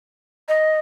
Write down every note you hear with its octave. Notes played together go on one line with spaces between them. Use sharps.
D#5